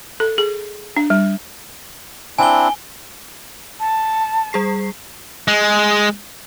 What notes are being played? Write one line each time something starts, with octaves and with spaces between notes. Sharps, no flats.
A4
G#4
D4
G3
C4 D4 E4 G#5 G7
A5
G3 G#4 C7
G#3